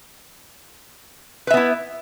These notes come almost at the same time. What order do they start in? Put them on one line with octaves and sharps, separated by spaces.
B4 E5 B3 E4